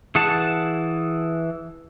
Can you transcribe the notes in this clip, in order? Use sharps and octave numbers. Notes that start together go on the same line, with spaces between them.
E3 G#4 F#5 A5